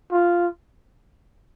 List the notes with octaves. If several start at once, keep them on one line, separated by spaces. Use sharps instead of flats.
F4